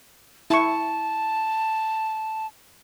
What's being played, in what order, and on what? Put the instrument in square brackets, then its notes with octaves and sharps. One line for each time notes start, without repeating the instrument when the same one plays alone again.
[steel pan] E4 C#6 [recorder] A5